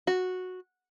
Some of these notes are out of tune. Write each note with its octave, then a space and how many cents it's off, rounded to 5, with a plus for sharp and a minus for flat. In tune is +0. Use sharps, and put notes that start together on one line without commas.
F#4 -10